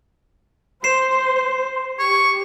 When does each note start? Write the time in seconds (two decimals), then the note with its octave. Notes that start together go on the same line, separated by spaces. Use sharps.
0.84 C5 C7 E7
1.99 G4 C#6